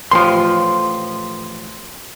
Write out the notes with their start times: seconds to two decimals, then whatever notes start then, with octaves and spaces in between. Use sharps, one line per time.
0.11 A1 F3 C6